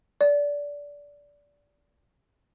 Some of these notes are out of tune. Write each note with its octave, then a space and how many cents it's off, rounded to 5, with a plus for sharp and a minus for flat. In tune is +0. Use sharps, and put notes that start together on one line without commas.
D5 -20